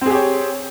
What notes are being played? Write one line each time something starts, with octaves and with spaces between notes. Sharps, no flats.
C4 G4 G#4 C#5